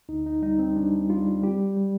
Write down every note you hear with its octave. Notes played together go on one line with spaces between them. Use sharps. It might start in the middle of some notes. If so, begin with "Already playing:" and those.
D2 D#4
D#4
G3 D#4
C4
G3 D4
G3 F4
G3 G4
G3